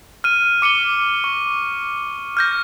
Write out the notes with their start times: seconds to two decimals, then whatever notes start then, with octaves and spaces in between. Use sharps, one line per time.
0.24 F6 D#7
0.62 D6 C#7 D#7 G7
1.24 C#6
2.37 F6 G6 A#6